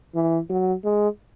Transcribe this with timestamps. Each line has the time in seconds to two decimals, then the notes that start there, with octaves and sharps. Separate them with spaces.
0.15 E3
0.50 F#3
0.84 G#3